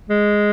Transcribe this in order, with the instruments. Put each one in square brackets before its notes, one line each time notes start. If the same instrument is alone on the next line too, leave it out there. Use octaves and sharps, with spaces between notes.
[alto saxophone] G#3